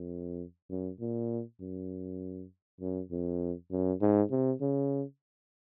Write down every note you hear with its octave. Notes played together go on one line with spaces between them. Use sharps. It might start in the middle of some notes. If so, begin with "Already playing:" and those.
Already playing: F2
F#2
A#2
F#2
F#2
F2
F#2
G#2
C3
C#3